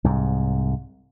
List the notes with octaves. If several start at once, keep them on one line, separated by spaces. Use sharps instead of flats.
C2 G#2